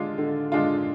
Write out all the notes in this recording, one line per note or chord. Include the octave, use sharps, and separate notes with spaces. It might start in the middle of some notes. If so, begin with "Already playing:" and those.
Already playing: D3 G#3 D4 F4
D3
G#3 D4 F4